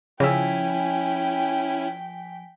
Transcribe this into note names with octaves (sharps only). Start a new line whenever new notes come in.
C#3 F3 C#4 E4 G5 G#5 E6 B6